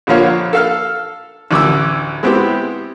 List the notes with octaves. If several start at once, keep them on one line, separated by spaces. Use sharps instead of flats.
A#1 D3 F3 A#3 C#5 F5
A4 F5 F6
A1 D2 D6 E6
G#3 B3 C4 E4 G4